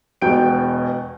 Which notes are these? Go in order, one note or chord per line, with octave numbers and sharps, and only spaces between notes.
E1 E2 B2 G5 G6 D7